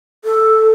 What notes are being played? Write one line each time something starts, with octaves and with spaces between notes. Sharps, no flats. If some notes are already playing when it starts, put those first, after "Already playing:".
A4